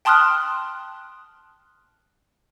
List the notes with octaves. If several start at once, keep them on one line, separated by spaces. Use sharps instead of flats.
G5 A5 C6 D#6 F6 F#6